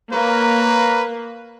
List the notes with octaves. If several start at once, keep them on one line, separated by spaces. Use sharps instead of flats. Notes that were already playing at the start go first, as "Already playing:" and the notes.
A#3 B4 C#5 F5 A#5